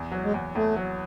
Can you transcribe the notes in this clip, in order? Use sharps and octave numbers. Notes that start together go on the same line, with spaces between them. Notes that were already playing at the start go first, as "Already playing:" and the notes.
Already playing: E2
F#3
G#3
E2
E2 A3
F#3